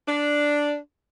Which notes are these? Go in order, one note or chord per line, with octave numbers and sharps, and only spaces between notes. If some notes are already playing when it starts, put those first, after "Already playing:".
D4